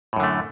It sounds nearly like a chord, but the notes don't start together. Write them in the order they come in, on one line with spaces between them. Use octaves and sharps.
A2 F#2 D3 A3